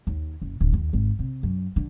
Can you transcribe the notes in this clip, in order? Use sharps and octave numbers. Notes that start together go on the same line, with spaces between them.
D#2
F#1
D1
D#2
G#1
C3
F#2
D3